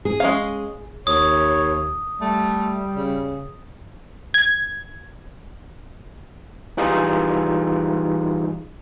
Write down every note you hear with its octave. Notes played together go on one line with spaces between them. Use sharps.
G#4
G#3 C#4 F5
D#2 C#5 D#6
G3 A3
C#3
G#6
E3 G3 D#4 F4 G4 G#4